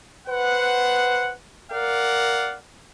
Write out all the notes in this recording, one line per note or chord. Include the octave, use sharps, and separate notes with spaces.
B4 C5 F#5
A#4 D5 F5 F#5